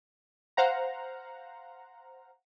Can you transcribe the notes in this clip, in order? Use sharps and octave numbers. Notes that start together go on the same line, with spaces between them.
C5 F5 F#5 A#5